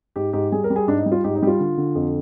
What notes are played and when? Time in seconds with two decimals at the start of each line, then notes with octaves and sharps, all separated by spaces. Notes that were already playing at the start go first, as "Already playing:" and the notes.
0.16 G#2 G4
0.33 G#2 G4
0.52 G3 G#4
0.64 A#4
0.70 G3
0.76 G#4
0.87 G#2 D4
0.99 D#4
1.06 G3
1.12 F4
1.24 G#2 G4
1.35 D#4
1.42 G3 G4
1.47 F4
1.60 D3
1.77 D3
1.95 F2